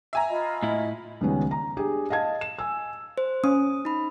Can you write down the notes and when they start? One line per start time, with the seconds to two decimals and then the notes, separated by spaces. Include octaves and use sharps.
0.13 E5 G#5 A#5
0.29 F4 D#5 B5
0.63 A2 E4
1.21 C#2 D#3 G3 B3 C#4
1.51 A#5
1.77 D4 G4 G#4
2.10 D#5 F5 A5 G#6
2.41 E7
2.59 G#5 E6
3.18 C5
3.44 C#4 D#6
3.85 D#4 B5